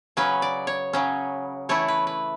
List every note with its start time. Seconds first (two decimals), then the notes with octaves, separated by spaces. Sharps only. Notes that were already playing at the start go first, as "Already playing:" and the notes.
0.17 C#3 F#3 C#4 B4
0.42 D5
0.67 C#5
0.93 C#3 F#3 C#4
1.69 E3 A3 E4 C#5
1.88 B4
2.07 B4